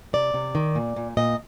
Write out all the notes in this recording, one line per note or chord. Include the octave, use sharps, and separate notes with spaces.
C3 D5
C3
D#3
A#2
A#2
A#2 D#5